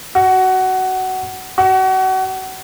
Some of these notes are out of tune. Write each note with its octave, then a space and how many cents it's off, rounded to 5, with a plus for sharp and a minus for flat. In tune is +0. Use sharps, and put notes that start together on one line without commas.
F#4 +15
F#4 +30